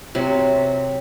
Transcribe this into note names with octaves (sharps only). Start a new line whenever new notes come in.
C3 F#3